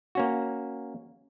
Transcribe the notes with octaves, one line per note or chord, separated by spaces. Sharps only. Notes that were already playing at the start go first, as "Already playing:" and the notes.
A#3 C#4 F#4